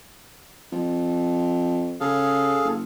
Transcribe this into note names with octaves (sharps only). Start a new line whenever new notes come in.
F2
C#3 G#4 A4 F5
F#1